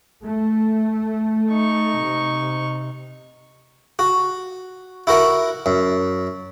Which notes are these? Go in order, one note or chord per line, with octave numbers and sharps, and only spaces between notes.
A3
D#4 C#6
C3
F#4
E4 F#4 A#4 F#5
F#2